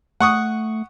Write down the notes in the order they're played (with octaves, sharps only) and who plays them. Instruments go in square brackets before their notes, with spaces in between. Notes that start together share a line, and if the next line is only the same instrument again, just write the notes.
[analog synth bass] A3 [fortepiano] F#5 C#6 D#6